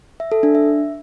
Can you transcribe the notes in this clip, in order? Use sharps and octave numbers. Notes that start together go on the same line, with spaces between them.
E5
A4
D4
E5